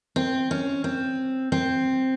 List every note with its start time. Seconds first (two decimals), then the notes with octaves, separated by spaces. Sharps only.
0.16 C4
0.51 C#4
0.84 C4
1.52 C4